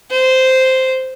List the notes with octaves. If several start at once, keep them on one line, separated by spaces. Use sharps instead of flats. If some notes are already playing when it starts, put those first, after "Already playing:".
C5